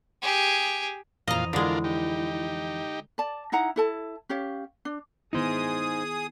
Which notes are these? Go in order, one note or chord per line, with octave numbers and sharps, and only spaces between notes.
G4 G#4
F2 A#2 E3 F4 D#5 F5 A#5
D3 G#3 D4 E4 F4 A#4
D#4 G4
D5 A5
D#4 E4 F#5 A#5
E4 A4 A5
C#4 G4 C#5 F5
D4
D#3 B3 D#4 E4 G#4 C5 D#6